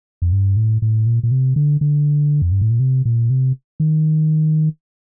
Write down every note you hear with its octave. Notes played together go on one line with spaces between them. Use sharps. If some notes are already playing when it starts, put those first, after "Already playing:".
F2
G2
A2
A2
A#2
A#2
C3
D3
D3
F2
G2
A2
A#2
C3
A#2
C3
D#3